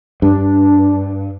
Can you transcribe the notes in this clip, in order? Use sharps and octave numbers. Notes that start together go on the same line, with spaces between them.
G2 D4